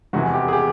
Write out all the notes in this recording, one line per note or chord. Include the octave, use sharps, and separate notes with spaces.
F1 E2 C3 E3 F#4
G4
G#4
G4